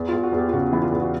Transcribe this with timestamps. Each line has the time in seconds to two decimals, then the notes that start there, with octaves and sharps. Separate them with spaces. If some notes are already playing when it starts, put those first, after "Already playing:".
Already playing: E2
0.09 F4
0.13 E2
0.23 F#4
0.33 E2
0.38 G4
0.49 F4
0.52 C#3 F#4
0.72 E3 E4
0.82 F4
0.92 E2
1.01 F#4